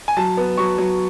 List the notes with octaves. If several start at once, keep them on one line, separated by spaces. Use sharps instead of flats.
G#5
F#3 A5
B3
F#3 C#6
F#3